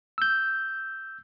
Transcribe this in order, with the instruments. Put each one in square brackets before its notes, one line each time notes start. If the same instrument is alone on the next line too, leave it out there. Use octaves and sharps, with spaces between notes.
[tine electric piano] E6 G6